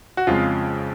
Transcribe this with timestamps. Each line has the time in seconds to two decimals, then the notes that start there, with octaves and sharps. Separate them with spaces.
0.17 F#4
0.27 F2 C#3 G#3 F4